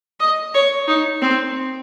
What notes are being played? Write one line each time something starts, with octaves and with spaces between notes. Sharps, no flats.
D#5
C#5
D#4
C4